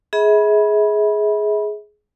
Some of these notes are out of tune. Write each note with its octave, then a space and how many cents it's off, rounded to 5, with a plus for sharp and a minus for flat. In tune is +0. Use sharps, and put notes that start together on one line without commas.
G#4 +15 E5 -40 B5 -20